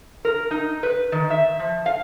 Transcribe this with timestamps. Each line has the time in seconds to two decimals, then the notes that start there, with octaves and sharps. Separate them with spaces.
0.25 A#4
0.51 D#4
0.83 B4
1.12 D#3
1.30 E5
1.59 F3
1.86 F5